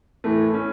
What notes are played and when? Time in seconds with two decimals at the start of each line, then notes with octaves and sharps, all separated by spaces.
0.24 A2 E3 A3
0.54 C#4